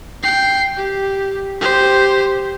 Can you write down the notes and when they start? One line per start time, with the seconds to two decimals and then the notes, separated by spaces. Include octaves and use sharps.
0.23 G5 C7
0.77 G4
1.61 G4 C5